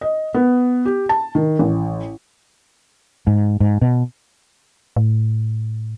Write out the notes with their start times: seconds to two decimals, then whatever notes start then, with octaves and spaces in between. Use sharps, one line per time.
0.01 D#5
0.34 B3
0.85 G4
1.09 A5
1.35 D#3
1.59 A1
3.27 G#2
3.60 G#2
3.82 B2
4.96 A2